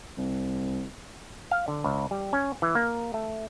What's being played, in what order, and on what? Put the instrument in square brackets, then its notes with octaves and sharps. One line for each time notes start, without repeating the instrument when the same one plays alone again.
[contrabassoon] C2
[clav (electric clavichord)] F5
D3
C#2
G3
C#4
E3
A#3
A3